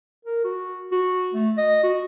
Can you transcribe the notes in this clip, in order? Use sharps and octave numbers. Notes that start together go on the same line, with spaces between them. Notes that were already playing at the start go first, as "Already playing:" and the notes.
A#4
F#4
F#4
A3
D#5
F#4